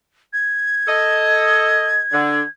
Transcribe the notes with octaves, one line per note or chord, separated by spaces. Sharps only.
G#6
A4 D#5
D3